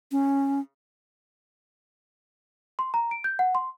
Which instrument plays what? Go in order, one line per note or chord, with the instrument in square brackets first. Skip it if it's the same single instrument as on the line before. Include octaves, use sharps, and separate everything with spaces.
[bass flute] C#4
[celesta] C6
A#5
D7
G6
F#5
C6